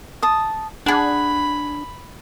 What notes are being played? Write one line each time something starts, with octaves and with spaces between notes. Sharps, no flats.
A5 D#6
D4 G#4 F#5 B5